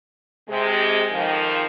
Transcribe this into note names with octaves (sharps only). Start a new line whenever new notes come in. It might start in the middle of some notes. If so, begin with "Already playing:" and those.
C3 G#3
F2 D#3 F3